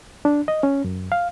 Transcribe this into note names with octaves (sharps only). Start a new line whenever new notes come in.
D4
D#5
C#4
F#2
F5